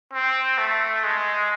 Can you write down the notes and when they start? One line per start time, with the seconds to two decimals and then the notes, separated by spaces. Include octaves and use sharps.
0.13 C4
0.58 A3
1.04 G#3